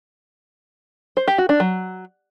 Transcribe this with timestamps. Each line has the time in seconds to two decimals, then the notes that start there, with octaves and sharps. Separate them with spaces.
1.17 C5
1.28 G4
1.38 F#4
1.49 D4
1.60 F#3